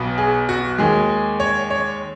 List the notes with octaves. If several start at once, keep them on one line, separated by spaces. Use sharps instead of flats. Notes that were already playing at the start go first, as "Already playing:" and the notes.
Already playing: B1 B2 B3
G#4
F#4
D#2 D#3 G#3 G#4
C#5
C#5